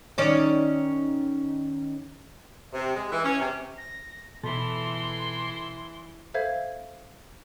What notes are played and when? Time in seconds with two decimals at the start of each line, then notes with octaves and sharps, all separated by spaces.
0.18 D#3 C#4 D5
2.73 C3
2.96 G#3
3.12 E3
3.24 C#4
3.40 C3
3.78 A#6
4.44 B2 E3 E4 A4 B5 C6
6.34 A4 C5 E5 F5 G#6